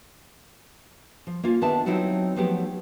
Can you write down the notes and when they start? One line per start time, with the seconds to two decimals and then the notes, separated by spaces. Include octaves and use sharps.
1.27 F3
1.43 A#3 C#4 F4
1.61 D#3 B3 D4 G4 E5 A5
1.86 F#3 C4 D#4 E4 F#4
2.36 F3 F#3 A3 B3 F#4 G4